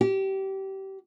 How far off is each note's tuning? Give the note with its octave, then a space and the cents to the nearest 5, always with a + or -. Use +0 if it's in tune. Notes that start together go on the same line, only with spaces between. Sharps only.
G4 -25